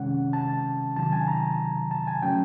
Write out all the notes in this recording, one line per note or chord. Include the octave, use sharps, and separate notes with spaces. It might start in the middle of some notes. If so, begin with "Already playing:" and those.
Already playing: C3 D#3 G#3 C#4 F#5
A5
C3 D#3 F#3 A5
G#5
A#5
A5
G#5
C#3 F#3 A3 C#4 G5